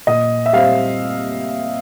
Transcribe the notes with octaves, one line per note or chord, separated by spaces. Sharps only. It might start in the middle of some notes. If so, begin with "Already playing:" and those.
A#2 D#5
E5
G3 C4 F5